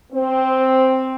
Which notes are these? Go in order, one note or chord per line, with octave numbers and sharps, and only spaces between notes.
C4